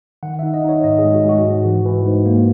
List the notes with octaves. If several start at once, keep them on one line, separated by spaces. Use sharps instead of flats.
D#3 F#5
D#4 E5
D#5
D#4 C#5
G#2 D#5
G#4
G#3
F#4
G#3 F#4
G#2
E3
E3
G#2
A#3